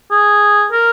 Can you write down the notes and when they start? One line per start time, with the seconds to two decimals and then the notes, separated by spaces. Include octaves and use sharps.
0.11 G#4
0.71 A#4